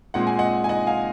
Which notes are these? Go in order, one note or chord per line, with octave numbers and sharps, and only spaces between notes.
A#2 G#3 C4 F#5
G#5
D#5 F#5
G#5
D#5 F#5
F5 G#5